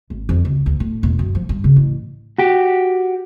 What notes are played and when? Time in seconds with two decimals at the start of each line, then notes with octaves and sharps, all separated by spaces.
0.10 G#1
0.29 F2
0.45 C#2
0.66 D2
0.80 A2
1.03 E1
1.19 F#2
1.35 F3
1.49 G2
1.64 C#3
1.76 A1
2.38 F#4 G4